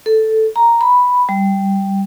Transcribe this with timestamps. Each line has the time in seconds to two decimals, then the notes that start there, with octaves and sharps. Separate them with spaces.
0.06 A4
0.56 A#5
0.81 B5
1.29 G3